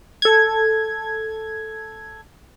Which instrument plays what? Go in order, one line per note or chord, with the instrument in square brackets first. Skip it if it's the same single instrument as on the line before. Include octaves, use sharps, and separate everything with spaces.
[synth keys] A4 G#6